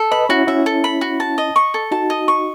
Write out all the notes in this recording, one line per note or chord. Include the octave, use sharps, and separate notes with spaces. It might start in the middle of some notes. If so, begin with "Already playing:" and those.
Already playing: A4
B4 D#5 B5
C#4 E4 F#4
C#4 E4 E5
A4
B5
F#4
A5
D#5
C#6
A4
D#4 F#4 A5
D#5
C#6